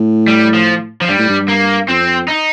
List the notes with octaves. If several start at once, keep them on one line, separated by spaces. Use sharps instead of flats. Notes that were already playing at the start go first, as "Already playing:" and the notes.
Already playing: A2
G3
F3
F3
G2 G3
A2
G2
A#3
F2 C4
D#4